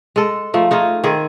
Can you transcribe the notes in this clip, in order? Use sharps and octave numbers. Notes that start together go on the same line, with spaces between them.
G#3 A4
F3 A3 D#4
A3 D#4 F4 G#4
D#3 C4 G#4